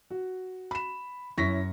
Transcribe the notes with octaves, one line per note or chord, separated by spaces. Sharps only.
F#4
B5 E7
F#2 C#4 E4 C#6 A#6 B6